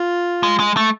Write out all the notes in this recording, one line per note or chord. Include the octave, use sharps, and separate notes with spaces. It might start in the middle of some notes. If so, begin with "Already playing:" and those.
Already playing: F4
G#3
G#3
A3